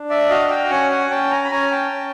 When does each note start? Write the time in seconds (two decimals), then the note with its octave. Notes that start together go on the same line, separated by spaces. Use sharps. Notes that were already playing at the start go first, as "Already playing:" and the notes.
Already playing: D4
0.10 D5 E5
0.29 F#4 D#5 F5
0.50 F5 G5
0.70 C#4 F#5 G#5
0.90 F#5 G#5
1.10 C#4 G5 A5
1.31 G#5 A#5
1.45 B5
1.51 C#4 G#5 A#5
1.71 G5 A5
1.92 C#4